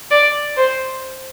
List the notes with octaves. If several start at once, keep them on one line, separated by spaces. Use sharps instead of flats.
D5
C5